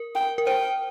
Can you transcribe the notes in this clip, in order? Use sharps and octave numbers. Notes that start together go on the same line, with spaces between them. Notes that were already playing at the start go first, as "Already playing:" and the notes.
Already playing: A#4
G5
A#4
C5 G5